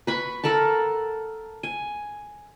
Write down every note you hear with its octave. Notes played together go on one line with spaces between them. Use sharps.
B4 B5 C#6
A4 A#4 F#5 A5
G#5